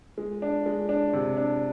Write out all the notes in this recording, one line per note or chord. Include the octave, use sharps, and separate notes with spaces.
G#3
D4
G#3
D4
C3
D4